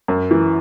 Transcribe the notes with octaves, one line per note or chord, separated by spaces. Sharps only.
F#2
E3